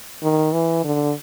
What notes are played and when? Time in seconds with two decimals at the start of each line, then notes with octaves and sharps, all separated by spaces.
0.23 D#3
0.53 E3
0.84 D3